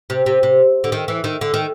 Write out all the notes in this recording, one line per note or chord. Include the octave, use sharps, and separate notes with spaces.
C3
C3
C3
D3
D#3
E3
D#3
D3
D#3